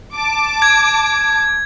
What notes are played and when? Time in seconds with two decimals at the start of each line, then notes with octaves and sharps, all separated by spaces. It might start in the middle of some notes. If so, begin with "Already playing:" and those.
0.14 A5 D6
0.62 G#6